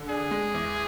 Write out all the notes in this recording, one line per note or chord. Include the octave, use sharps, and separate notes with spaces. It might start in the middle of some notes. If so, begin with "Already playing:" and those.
Already playing: D3
D4 G#4
G#3
E2